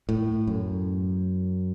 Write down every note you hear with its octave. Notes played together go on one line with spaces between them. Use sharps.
A2
F#2